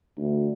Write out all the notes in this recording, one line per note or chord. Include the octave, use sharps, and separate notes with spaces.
D2